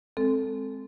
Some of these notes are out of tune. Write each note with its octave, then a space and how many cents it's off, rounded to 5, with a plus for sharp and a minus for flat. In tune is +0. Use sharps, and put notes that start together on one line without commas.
G#3 +0 C4 +0 A4 +0